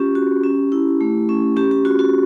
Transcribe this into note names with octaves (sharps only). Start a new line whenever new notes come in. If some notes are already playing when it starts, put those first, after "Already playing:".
Already playing: C#4 F4 G4
F#4
C#4
E4
A3
C#4
C#4 G4
G4
F4 F#4
F#4